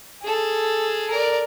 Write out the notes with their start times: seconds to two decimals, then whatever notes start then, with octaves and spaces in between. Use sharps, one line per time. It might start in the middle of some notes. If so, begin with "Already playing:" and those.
0.22 G#4 A4
1.10 A#4 D5